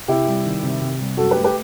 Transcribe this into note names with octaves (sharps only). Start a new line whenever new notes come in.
C3 E4 G4
G3
D#3
C3
C3
G3
F#2 F#4 A4
G4 B4
A3
G4 B4